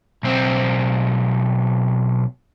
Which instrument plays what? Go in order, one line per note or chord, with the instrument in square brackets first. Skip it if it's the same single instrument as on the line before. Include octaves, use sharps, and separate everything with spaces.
[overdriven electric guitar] B1 C4